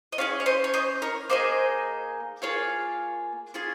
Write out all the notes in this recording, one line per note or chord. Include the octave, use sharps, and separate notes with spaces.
D#5
C#4 F4 G#4 C#5 F5
C#5
C5 D#5
C#5
C5 D#5
A#4 C#5
A#3 D#4 G#4 C5 D#5
A#3 F4 G#4 C#5 F5
C#4 F4 G#4